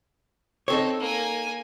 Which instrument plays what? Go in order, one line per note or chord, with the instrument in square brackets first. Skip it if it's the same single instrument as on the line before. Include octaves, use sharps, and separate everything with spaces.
[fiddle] C4 [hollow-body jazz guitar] D#4 A4 C#5
[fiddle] A#3 G#5